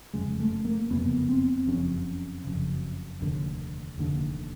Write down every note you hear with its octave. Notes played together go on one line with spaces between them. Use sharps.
F#1 F2 C#3 G#3
A3
A#3
F#1 F2 C#3 B3
C4
F#1 F2 C#3 C#4
F#1 F2 C#3
F1 D#2 D3
F1 D#2 D3